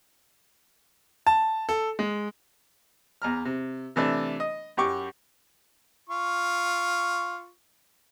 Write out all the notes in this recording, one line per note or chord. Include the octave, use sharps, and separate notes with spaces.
A5
A4
G#3
E2 A#5 F6
C3
C3 E3 A3 D4
D#5
F#2 G4 C#6 D6
F4 C#6